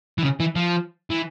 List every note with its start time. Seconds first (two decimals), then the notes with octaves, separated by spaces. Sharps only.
0.18 E3
0.23 C#3
0.40 E3
0.55 F3
1.10 E3